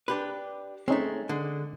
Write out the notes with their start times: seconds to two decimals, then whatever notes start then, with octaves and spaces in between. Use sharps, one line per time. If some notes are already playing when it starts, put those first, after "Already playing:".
0.08 D4 G4 B4
0.88 G#3 A3 C4 C#4 D#4
1.29 D3 G#3